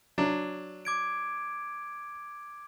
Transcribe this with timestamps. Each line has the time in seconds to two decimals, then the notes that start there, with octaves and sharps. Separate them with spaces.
0.18 F#3 D4
0.85 D6 G#6 D7